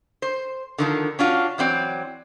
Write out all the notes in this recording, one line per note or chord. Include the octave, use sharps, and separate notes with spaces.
C5
D3 D#3 F3
C#4 D4 F4 F#4
E3 F#3 C4 D5